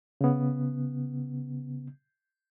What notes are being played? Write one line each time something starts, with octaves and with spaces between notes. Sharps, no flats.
C#3 B3